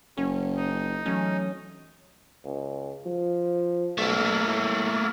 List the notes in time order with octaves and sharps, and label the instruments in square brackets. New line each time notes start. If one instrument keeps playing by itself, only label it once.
[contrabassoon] F#1 [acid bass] C#4 [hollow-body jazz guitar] C#5
[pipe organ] D#4
[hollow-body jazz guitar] E3 F#3 A3 [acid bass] C#4
[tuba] C#2
F3
[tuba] B1 [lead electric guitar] A3 A#3
[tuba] A2